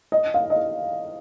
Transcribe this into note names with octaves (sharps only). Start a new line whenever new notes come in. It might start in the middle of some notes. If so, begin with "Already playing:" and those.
D#5
F5
D#5